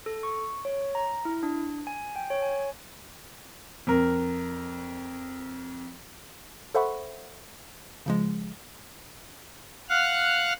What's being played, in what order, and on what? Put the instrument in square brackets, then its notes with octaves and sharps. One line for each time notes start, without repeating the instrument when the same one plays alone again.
[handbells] A4
C#6
C#5
A#5
E4
D4
G#5
G5
C#5
G#5
[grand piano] F2 A#4
[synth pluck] A4 C5 E5 F#5 B5 C#6
C#3 F3 G#3
[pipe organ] F5 F#5 F6 F#6